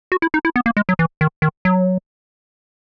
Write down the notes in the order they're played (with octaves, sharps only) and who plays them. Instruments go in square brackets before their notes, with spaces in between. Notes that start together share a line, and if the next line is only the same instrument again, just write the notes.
[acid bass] F#4
E4
D#4
E4
B3
A#3
G#3
F#3
E3
D#3
D#3
F#3